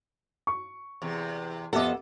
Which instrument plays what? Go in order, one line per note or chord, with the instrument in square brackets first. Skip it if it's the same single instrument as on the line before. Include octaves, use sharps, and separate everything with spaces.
[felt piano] C#6
[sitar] E2 C3
[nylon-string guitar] F2 B3 F#5 [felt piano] G4 E5 D6 [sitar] A4 D#5